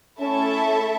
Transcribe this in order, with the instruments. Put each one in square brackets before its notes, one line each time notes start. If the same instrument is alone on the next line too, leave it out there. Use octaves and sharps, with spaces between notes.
[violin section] A3 E4 A4 E5 A5 [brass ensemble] C#4